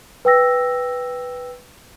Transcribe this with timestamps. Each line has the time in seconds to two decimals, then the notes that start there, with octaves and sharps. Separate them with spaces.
0.25 B4 G5 E6 A#6